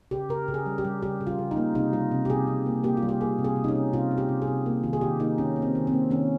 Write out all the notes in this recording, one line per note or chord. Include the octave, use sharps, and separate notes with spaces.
C#3 G4
C#3 A#4
C#3
G#4
G3
G4
G3
C#3 G4
C#3
F4
C#3
D#4
A#3
C3 D#4
G3 F4
C3
G4
C3 G#4
C3
A#3
A#3 G4
F4
G3
G4
A#3 G#4
C3
G#4
C3
D#4
C#4
C3
C3 F4
C3
G4
C3
G#4
C3
A#3
D#3 F4
G#4
D#3 G4
A#3 D#4
D#3 C#4
A#3
C4
D#3
C4
A#3
D#3 C#4